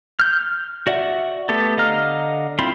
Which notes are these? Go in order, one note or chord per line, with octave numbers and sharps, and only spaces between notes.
F6 G6
F#4 D5 E5 F#5
A3 B3 G4 A4
D3 D#5 F5 A#5 F6
C4 E4 F4 B5 C6